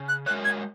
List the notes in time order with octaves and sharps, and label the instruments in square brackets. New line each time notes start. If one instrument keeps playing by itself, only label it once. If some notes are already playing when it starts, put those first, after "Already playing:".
Already playing: [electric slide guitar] C#3
[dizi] F#6
[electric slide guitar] G#3 F#4 A#4 C#5 [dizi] F#6
[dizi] G#6